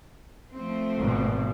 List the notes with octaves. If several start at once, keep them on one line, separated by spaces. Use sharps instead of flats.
F3 A3 C4
G#1 B2